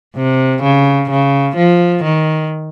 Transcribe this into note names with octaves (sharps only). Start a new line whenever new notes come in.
C3
C#3
C#3
F3
D#3